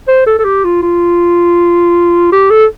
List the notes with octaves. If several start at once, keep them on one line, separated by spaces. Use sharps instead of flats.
C5
A4
A4
G4
F4
F4
G4
A4